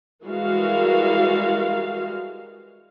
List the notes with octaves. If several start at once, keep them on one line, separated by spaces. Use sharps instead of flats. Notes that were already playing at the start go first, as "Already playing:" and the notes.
E3 G3 G#3 F#4 A#4 F5